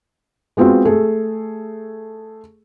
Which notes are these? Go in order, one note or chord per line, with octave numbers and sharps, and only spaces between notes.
G#3 B3 C4 F4 F#4
A3 G#4 A4